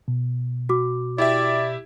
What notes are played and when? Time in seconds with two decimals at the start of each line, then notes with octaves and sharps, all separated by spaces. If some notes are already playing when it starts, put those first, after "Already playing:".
0.08 B2
0.69 F#4 D6
1.18 E4 G4 D5 E5